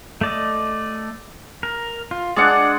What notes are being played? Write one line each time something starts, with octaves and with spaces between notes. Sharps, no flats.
A3 D5 D#5
A#4
F4
G#3 D4 D5 F#5